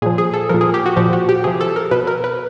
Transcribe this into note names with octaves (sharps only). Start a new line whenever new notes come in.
A#2 F3 G#4
G#4
A4
A#2 F3 A#4
G#4
G4
F#4
A#2 F3 G4
F#4
G4
C3 F3 G#4
A4
A#4
B2 B4
A#4
B4